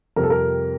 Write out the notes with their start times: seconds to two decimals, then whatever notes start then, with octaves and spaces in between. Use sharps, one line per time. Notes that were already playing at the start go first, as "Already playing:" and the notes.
0.16 F2 C3 G3 A#4
0.23 A4
0.30 A#4